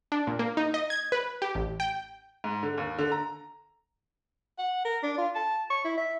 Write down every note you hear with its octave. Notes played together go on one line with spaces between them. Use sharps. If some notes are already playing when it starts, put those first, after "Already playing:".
D4
A#2
A#3
D#4
D#5
G#6
B4
G4
A1
G5
G#2
D3
D#2
D3
A#5
F#5
A#4
D4
F4
A5
C#6
E4
E5